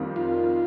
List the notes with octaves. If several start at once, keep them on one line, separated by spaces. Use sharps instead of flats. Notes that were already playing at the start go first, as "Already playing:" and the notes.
Already playing: F2 D#3 G3 A#3 D#4
F4